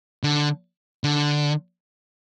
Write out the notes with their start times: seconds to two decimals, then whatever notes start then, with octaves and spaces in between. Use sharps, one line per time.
0.23 D3
1.04 D3